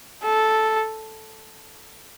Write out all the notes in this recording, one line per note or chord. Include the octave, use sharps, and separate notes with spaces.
A4